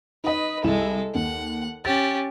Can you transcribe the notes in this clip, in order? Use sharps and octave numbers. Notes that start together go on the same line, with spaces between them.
D#4 B4 D#5
C2 G#3 E4 A4 E7
D#2 F#5
C#4 G4 A6